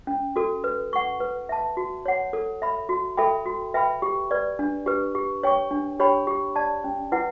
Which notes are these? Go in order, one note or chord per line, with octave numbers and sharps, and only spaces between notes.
C#4
F#4 A4
B4
F#5 C#6
B4
E5 A5
F#4
C#5 F#5
A4
E5 B5
F#4
A4 E5 G5 B5
F#4
B4 E5 G5 B5
G4
B4 D5
D4
G4 B4
G4
C#5 G5 C#6
D4
G4 C#5 G5 B5
G4
D5 A5
C#4
E4 B4 F#5